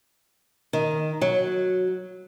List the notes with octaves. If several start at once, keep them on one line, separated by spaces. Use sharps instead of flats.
D#3
F#3